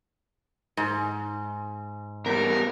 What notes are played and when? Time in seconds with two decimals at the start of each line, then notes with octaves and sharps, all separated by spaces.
0.77 G#2
2.26 E2 G3 A#4